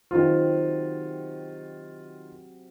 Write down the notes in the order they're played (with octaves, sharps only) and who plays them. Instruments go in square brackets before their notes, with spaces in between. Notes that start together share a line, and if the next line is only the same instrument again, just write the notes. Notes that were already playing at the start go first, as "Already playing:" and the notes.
[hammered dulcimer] C3 F#3 [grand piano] D#3 F4